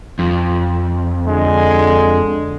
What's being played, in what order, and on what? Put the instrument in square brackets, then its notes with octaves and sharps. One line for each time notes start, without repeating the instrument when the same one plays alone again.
[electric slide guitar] F2
[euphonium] D3 [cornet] G#3